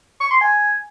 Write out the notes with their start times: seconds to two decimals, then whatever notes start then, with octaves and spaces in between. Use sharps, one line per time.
0.20 C#6
0.31 C6
0.41 G#5